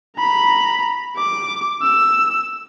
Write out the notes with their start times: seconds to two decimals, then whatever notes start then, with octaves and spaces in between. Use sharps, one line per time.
0.17 A#5 B5
1.17 D6
1.82 E6